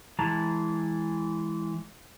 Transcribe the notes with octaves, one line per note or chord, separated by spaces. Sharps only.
E3 G#3 A5 A#5